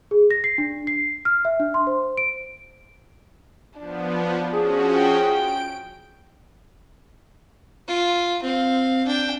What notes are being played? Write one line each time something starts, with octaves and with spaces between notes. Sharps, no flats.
G#4
A#6
C7
D4
C7
F6
E5
D4
C6
C5
D7
F3 B3 D4
F3 C#4 F#4 G#4
G5
D7
F4
C4 F5
D4 G5